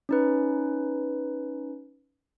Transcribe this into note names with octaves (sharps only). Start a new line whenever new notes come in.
C#4 D#4 B4